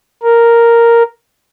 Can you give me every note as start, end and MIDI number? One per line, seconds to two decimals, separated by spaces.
0.23 1.03 70